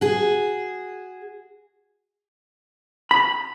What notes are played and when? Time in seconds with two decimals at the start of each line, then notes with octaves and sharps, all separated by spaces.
0.01 F#4 G#4
3.11 B5